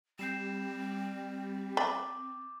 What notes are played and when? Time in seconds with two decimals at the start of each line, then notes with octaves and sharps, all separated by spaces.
0.19 G3 C4 G6 C7 E7
1.77 B5 D6 A6